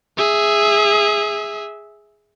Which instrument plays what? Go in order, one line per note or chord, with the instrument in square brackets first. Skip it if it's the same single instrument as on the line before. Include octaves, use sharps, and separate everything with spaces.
[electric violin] G#4 E5